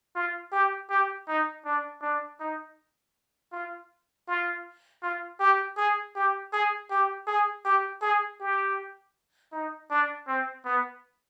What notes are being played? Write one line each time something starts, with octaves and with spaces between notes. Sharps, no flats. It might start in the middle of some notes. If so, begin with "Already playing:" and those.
F4
G4
G4
D#4
D4
D4
D#4
F4
F4
F4
G4
G#4
G4
G#4
G4
G#4
G4
G#4
G4
D#4
D4
C4
B3